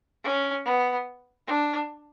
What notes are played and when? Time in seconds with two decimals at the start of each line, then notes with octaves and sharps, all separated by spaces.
0.24 C#4
0.65 B3
1.47 D4